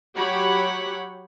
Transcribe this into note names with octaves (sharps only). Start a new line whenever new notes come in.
F#3 G4 C#5 F#5 B5